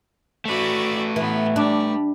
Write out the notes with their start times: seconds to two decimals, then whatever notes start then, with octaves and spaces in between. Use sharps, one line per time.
0.45 A3 F#4 B4 D5 E5
1.16 A2 E3 B3
1.56 G3 D4